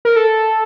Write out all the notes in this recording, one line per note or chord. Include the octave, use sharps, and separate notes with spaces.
A#4
A4